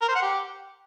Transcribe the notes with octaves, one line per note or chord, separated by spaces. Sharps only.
A#4
C5
F#5
G4